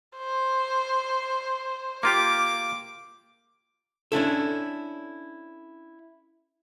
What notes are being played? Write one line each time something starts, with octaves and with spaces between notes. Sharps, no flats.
C5
A#3 F4 G4 D6
C#4 D4 E4 A4